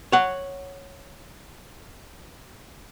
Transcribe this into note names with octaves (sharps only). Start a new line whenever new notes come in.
C#5 F#5